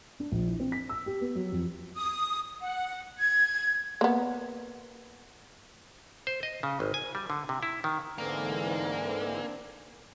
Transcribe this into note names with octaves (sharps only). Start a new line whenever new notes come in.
D4
A#1
E3
C4
B6
E6
G4
B3
F#3
F2
D#6
F#5
G#6
A#3 B3
C5
D#5
C#3
G#1
G#5
G3
D3
C3
E4
D#3
G#2 D3 E3 A#3 C4 D4 D5